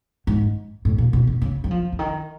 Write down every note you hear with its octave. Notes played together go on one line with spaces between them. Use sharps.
G#2
A2
A#2
B2
B2
C#3
F#3
F3
D3
D#3